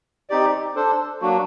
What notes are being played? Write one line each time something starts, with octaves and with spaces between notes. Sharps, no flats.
C4 D#4 G4 D5
D4 A4 C5
F#3 A#3 D4 F#4